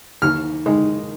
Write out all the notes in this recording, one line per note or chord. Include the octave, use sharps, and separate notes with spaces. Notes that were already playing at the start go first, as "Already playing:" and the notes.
D#2 F6
D#3 G#3 D#4